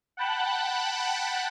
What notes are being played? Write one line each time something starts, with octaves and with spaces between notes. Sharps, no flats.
F#5 G5 A5 B5 F#6